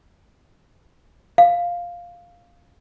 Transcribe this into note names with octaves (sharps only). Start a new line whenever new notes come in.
F5